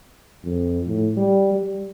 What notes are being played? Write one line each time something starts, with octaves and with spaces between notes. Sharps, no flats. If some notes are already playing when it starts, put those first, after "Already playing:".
F2
A2
G3
G3